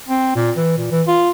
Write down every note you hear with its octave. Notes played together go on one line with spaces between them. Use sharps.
C4
A#2
E3
A#2
E3
F4